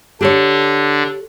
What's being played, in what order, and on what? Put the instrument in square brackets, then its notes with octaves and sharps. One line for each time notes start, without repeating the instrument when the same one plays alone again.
[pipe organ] D3 D4 [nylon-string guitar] G4 A4 C#5